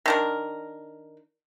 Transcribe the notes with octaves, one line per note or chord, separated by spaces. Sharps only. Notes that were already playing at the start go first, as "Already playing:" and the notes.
D#3 D4 A#4